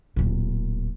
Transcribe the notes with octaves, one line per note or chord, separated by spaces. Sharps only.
D1 A#2